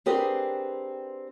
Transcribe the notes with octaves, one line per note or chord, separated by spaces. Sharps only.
C4 D4 G4 G#4 A#4 B4